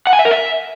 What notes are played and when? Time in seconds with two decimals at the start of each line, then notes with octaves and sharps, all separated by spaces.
0.07 F#5
0.13 G#5
0.19 E5
0.25 A#4
0.31 E5